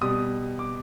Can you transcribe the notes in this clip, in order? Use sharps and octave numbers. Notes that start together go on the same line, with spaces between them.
B2 G3 D#6
D6